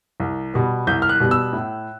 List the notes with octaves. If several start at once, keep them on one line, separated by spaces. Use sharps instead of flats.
C2
B2 G3 B3
C2 G6
F6
F#6
B2 G3 B3
E6
A2